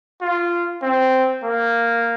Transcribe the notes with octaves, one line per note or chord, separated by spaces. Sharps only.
F4
C4
A#3